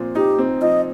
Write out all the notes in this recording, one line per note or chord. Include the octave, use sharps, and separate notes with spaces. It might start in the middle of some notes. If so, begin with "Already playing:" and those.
Already playing: A#2 F3 C4
D#4 G4
C4
F3 D#5